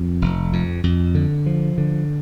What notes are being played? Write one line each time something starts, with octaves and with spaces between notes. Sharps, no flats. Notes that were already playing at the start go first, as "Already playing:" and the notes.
Already playing: F2
F1
F2
F2
D3
F3
D3